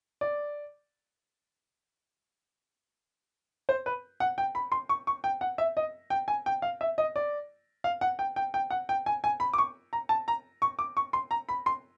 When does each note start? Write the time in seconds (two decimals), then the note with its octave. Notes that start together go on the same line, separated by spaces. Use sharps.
0.21 D5
3.69 C5
3.86 B4
4.20 F#5
4.38 G5
4.55 B5
4.72 C6
4.89 C#6
5.07 C#6
5.24 G5
5.41 F#5
5.58 E5
5.77 D#5
6.10 G5
6.28 G#5
6.46 G5
6.62 F5
6.81 E5
6.98 D#5
7.16 D5
7.84 F5
8.01 F#5
8.19 G5
8.36 G5
8.54 G5
8.70 F#5
8.89 G5
9.06 G#5
9.24 G#5
9.40 B5
9.53 D6
9.58 C#6
9.93 A#5
10.09 A5
10.28 A#5
10.62 C#6
10.79 D6
10.97 C#6
11.13 C6
11.31 A#5
11.49 B5
11.66 C6